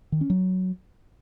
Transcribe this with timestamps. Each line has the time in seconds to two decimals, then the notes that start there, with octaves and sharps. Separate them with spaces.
0.12 D#3
0.21 C#4
0.30 F#3